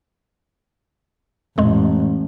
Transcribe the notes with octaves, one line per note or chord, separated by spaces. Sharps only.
A1 F2 G#3